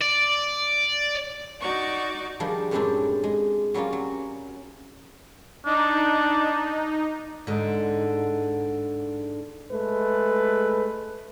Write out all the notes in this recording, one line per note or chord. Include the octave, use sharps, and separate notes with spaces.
D5
D#4 F#4 D5 C#6
D#3 F3 G3 D4 G#4 A#4
F#2 A2 G3 G#3 C4 D4
G#3
F#3 G3 A#3 C#4 F4
F#3
D4 D#4
G#2 D3
G#3 A3 B4